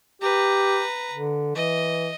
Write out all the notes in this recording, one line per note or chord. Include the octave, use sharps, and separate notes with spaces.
G4 B4 A#5
D3
E3 D#5